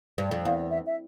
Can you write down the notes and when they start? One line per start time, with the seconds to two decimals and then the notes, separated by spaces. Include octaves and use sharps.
0.18 G2
0.31 F2
0.45 E2 F5
0.70 E5
0.86 E5